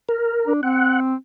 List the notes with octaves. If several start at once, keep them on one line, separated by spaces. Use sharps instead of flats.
A#4
D4
C4 F#5